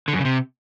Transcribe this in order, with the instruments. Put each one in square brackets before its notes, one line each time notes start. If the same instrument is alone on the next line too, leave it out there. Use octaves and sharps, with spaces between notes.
[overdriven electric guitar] D3
F#2
C#3
C3